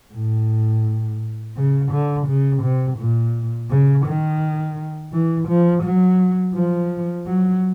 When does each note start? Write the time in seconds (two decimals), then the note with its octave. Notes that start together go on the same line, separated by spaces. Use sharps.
0.14 A2
1.57 C#3
1.92 D3
2.27 C#3
2.63 C3
2.98 A#2
3.70 C#3
4.06 D#3
5.13 E3
5.48 F3
5.84 F#3
6.55 F3
7.26 F#3